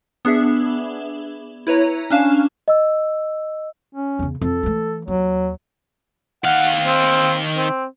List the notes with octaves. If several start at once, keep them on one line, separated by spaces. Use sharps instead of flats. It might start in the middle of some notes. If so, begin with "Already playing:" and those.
B3 D4 G#4 E5
E4 B4 C#5 A#5
C#4 D4 F5 G#5 E7
D#5 E6
C#4
E2 C#3
F2 A4
E3 A3
D#2 F#3
D#3 F5 F#5
C4
C4